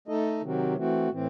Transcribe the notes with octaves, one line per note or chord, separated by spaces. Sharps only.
A3 D#4 A4 D#5
C3 D#3 F#3 C4 F#4
E3 A3 C4 F#4
A2 E3 C4